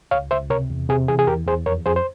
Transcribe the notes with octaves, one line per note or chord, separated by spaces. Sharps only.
C#2 C#5 F5
C#2 C5 E5
C3 A#4 C#5
E2
C3 G#4
E3 G#4
G#4
E2 G4 A#4
E2 G#4 C5
F2 A#4 C#5
F2 G#4 C5
C5